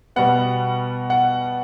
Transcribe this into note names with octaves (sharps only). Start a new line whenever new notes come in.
B2 G3 B3 F#5
F#5